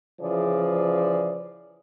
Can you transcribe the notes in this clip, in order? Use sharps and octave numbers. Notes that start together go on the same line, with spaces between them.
C#3 E3 F3 G#4 D5